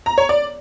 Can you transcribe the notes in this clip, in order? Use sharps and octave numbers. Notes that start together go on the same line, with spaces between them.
A#5
C#5
D5